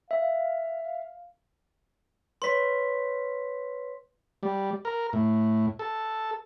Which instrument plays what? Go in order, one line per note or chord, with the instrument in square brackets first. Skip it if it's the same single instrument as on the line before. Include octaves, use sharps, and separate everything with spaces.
[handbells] E5 [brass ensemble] F5
[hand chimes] B4 C#5 [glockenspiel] C6 B6
[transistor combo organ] G3
A#4
A2
A4